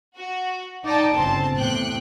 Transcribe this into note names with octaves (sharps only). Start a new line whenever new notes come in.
F#4
D#4 D5 G5 A5
G1 C#3 C4 A5
E2 A2 C3 G5 F#6